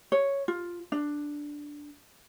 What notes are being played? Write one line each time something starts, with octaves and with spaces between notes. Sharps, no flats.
C#5
F4
D4